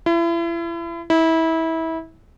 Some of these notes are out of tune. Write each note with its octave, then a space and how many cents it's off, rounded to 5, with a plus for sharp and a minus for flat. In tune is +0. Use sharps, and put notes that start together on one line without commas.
E4 +35
E4 -25